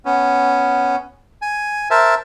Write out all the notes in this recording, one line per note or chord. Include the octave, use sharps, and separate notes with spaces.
B3 C#4
G#5
A#4 C5 E5 A5